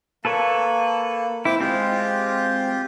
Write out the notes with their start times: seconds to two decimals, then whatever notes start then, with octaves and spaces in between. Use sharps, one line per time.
0.25 A#3 A4 B4 C#5
1.45 C4 E4 G5 D6
1.60 G#3 C4 F4 G4